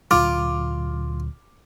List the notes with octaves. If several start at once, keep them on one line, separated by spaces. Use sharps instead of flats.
D2 A#2 F#3 F4 D6 F6